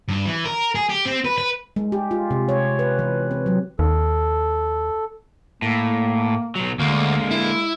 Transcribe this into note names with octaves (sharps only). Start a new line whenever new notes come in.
G2
E3
A#4
G#4
G4
C4
B4
B4
G#3
G4
F4
C3
C#5
B4
E3
C4
F#3
D#2 A4
A2 A#3
B1 F#3
D2 D3 G#3 A#3
E4